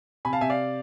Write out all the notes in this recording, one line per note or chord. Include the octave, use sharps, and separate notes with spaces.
C3 G#5 B5
F5 A5
C3 E5 G#5
D5 F5